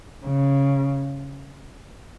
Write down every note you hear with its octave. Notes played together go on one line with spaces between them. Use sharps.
C#3